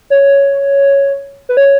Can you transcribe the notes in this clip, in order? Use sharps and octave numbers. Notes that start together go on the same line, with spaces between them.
C#5
B4
C#5